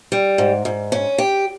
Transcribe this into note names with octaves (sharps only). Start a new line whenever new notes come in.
G3
G#2
G#2
C#4
G4